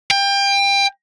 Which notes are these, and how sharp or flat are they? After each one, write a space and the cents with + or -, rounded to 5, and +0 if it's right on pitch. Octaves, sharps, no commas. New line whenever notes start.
G5 +25